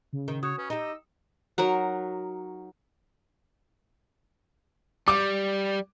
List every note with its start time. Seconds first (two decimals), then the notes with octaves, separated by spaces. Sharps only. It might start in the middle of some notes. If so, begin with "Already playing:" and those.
0.13 C#3
0.28 D#3
0.43 F#4 C#5 D#6
0.58 C#4 B4
0.70 D#4 G4 D#5 E6
1.58 F#3 D#4 A#4 F#5
5.08 G3 D6